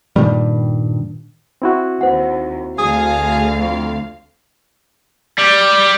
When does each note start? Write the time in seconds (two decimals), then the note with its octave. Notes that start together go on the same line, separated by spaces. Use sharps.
0.16 G2 A#2 D#3 G3
1.62 C4 E4 F#4
2.01 D#2 C5 F#5
2.78 D2 G#4 F5 D#6
3.59 F2
5.38 G3